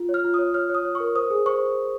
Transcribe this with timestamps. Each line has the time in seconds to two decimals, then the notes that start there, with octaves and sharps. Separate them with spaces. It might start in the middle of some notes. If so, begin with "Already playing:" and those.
Already playing: F4
0.09 C#5
0.14 F6
0.24 F4
0.34 D#6
0.39 C#5
0.54 C#5 F6
0.69 C#5
0.75 D#6
0.85 C#5
0.95 C#6
1.00 A#4
1.15 C5 D#6
1.30 G#4
1.46 C5 C#6